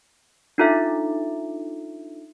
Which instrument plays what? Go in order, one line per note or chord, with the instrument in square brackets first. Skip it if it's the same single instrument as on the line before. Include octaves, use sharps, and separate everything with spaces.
[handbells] D4 D#4 F4 A4 E5